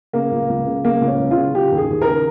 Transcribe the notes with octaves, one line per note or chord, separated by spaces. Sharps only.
C#3 A#3
C#2
C#2
C#3
C#3 A#3
C#2
C#4
C#2
F4
C#3
C#3 G4
D#2
G#4
D#2
C#3 A#4